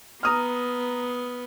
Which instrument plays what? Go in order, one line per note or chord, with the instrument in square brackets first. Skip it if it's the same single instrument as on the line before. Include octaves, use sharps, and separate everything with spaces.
[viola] B3 [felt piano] A#5 D#6 F6